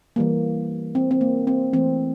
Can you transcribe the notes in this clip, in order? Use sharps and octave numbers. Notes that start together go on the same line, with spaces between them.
E3 G3 A#3
C4
C4
A#3
C4
E3 A3 C4